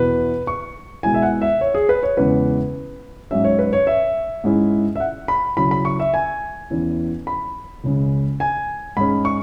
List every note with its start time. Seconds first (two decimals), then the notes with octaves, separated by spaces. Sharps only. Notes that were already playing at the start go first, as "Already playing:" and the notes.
Already playing: E2 B2 B3 E4 B4
0.47 C#6
1.03 B2 G#3 E4 G#5
1.14 E5
1.22 F#5
1.42 E5
1.61 C#5
1.74 G#4
1.89 B4
2.03 C#5
2.17 E2 C#3 G#3 C#4 E4 B4
3.31 G#2 F#3 C#4 E5
3.44 C#5
3.59 B4
3.73 C#5
3.87 E5
4.44 G#2 G#3 C#4 E4
4.96 E5
5.00 F#5
5.28 B5
5.57 C#3 F#3 E4 B5
5.71 B5
5.85 C#6
6.00 E5
6.14 G#5
6.70 E2 E3 C#4 E4
7.27 B5
7.84 C#2 C#3 G#3
8.40 G#5
8.97 G#2 G#3 C#4 B5
9.25 C#6